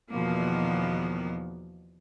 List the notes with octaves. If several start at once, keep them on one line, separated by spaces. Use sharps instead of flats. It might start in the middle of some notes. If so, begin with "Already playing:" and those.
E2 B2 D#3 F3 A#3 B3